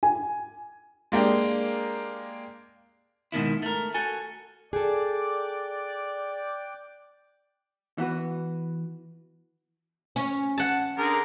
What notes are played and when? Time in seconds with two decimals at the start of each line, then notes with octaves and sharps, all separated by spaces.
0.03 G#5
1.12 G#3 A#3 D4 G4
3.32 G#2 B2 D#3 E4
3.62 A3 A#4
3.94 F#4 A4 G#5
4.73 G#4 A4 D5 G5 D6 F#6
7.98 E3 B3 F#4 B4
10.16 C#4
10.58 F#5 A5
10.98 D3 G#4 A#4